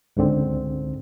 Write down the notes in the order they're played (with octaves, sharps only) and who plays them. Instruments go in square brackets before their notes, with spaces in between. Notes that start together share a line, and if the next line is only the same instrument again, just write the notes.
[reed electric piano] C#2 G#2 D3 C4